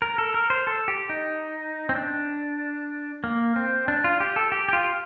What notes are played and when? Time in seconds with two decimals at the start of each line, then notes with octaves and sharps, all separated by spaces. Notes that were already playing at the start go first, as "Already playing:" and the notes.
0.02 A#4
0.18 A4
0.34 A#4
0.50 C5
0.67 A4
0.88 G4
1.09 D#4
1.89 C4
1.95 D4
3.24 A#3
3.56 C4
3.88 D4
4.04 F4
4.20 G4
4.36 A4
4.52 G4
4.69 G4
4.73 F4